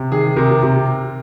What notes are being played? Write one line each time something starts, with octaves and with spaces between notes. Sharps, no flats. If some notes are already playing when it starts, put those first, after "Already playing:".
Already playing: C3
D#3 G#4
C3 A#4
C3